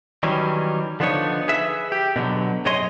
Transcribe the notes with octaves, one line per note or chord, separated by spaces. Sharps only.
D#3 E3 F#3 G3 C#4
D3 F3 B3 D4 D#4 C#5
G#4 B4 E5
G4
B2 D3 D#3 F#3
F#2 B2 G#4 C#5 D#5 C6